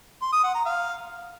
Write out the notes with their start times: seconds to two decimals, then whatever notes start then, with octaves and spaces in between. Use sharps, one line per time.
0.22 C6
0.33 D#6
0.44 F#5
0.55 A#5
0.65 F5